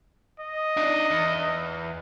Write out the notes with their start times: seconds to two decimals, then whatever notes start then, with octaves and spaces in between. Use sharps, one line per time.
0.40 D#5
0.77 D4 D#4
1.11 E2